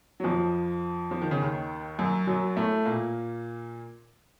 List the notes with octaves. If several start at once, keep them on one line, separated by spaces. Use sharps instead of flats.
F#3
F2 F3
F3
D#3
C#3
D#2 D#3
F#2 F#3
F#2 F#3
A2 A3
A#2 A#3